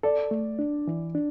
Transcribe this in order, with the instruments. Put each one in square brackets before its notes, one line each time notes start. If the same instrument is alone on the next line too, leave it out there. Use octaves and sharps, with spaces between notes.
[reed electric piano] A4 [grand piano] D5
[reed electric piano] A3
D4
E3
D4